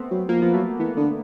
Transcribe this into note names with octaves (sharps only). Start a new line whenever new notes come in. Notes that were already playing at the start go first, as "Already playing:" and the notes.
Already playing: A3 B3 C4
F#3
F3 A#3
F3 B3
F#3 A3
E3 B3
D3 B3